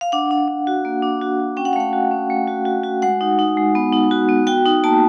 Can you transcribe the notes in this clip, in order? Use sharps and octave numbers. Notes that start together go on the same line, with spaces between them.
F5
D4 F#5
D4
D4
F#4
A#3
D4
F#4
F#4
C#4 G5
F#5
F5
A3 F#5
F#4
C#4
A3
F#4
F#4
F#4
G#3 F#5
D#4
D#4
G#3
B3
D#4
F#4
B3
F#4 G5
D#4
A#3 A5